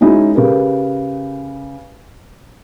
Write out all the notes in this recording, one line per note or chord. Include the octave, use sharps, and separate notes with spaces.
G#3 C#4 D#4 E4 F#4 G#4
C#3 G4 A#4 B4